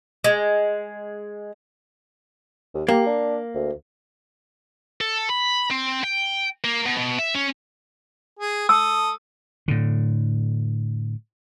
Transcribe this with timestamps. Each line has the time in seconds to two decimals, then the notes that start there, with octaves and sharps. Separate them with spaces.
0.24 G#3
2.74 D#2
2.88 A#3 G4
3.06 D4
3.54 D2
5.01 A4
5.30 B5
5.71 C4
6.04 G5
6.64 A#3
6.86 B2
6.97 B2
7.19 E5
7.34 C#4
8.39 G#4
8.69 A4 D#6 E6
9.68 A2 D3